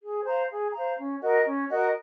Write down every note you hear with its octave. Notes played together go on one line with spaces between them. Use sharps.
G#4
C5 F5 A#5
G#4
C5 F5 A#5
C#4
F#4 A#4 D#5
C#4
F#4 A#4 D#5